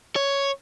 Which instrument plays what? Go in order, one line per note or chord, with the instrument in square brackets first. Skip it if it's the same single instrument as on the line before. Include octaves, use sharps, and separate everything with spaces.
[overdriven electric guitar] C#5